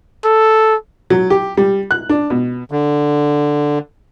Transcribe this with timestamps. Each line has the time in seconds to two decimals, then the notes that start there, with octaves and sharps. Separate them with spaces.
0.24 A4
1.10 F#3
1.30 G4
1.57 G3
1.91 F#6
2.09 D4
2.30 B2
2.71 D3